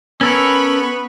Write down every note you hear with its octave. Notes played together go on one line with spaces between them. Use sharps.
B3 C#4 A4 A#4 B5 C#6